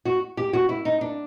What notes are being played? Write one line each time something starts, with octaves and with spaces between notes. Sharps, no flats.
F#4
G4
F#4
E4
D#4
D4